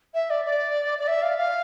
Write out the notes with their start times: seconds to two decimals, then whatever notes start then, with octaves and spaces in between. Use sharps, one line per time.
0.14 E5
0.30 D5
0.45 D5
0.99 D5
1.07 E5
1.22 F5
1.38 F5